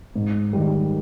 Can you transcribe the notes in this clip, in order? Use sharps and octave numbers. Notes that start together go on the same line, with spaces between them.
G#2
D#3 G3